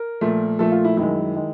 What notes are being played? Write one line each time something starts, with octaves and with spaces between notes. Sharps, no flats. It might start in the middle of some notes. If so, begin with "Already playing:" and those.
Already playing: A#4
A#2 F3 A3
A#2 F3 A3 A4
F4
E4
F#2 D#3 G#3 E4
D#3 G#3